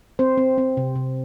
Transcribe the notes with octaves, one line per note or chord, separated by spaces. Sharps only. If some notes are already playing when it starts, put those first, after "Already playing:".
C4 C5
C4
C4
C3
C3